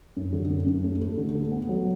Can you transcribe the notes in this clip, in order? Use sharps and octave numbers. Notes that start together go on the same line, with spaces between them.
F#2
D3
F#2
F#2
A3
A3
D3
A3
B3
F#3